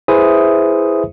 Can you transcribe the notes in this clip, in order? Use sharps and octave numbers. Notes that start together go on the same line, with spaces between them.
E4 G#4 B4 C5 E5 D#6